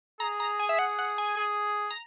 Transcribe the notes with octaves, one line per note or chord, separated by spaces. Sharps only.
G#4 A#5
A#5
G#5
E5
F#5
F#5
G#5
G#4
A#5